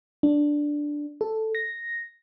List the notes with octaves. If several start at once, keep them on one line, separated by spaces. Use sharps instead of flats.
D4
A4
A#6